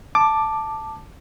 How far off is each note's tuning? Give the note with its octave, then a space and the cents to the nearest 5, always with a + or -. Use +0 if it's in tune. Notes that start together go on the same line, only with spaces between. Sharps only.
A5 +0 D6 +10